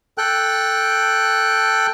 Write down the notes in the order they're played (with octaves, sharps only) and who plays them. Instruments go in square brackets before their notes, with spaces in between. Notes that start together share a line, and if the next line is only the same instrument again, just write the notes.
[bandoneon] A4 G5 F#6